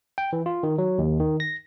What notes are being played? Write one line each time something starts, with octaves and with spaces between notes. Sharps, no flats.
G5
E3
F4
D#3
F#3
D#2
D#3
A#6